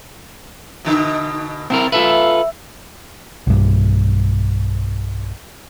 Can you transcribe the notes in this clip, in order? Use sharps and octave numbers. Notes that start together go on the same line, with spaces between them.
B2 D3 D#4
C3 C4 E4 A#4
F4 A4 B4 E5
B1 G2